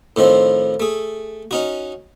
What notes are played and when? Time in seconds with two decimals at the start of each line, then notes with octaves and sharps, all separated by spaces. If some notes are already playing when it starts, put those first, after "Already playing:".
0.16 A2 D#3 F3 C4
0.80 A3 G#4
1.51 C#4 D#4 F#4